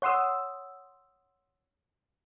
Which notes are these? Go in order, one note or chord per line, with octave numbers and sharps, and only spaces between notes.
C#5 F#5 C6 D#6 E6